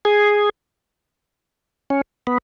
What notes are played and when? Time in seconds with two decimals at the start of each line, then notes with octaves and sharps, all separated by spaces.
0.05 G#4
1.90 C#4
2.27 B3